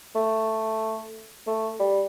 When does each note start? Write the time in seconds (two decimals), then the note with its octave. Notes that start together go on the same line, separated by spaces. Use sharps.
0.15 A3
1.47 A3
1.79 G3